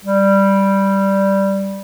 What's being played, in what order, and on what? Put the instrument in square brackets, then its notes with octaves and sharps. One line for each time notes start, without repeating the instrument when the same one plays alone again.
[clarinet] G3